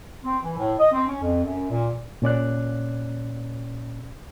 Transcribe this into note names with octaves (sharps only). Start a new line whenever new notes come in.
C4
E3
A2
D#5
C4
C#4
F2
F#2
A#2
A#2 C#4 D5 F#6